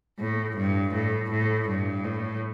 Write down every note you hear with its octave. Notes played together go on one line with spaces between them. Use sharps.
A2
G2
A2
A2
G2
A2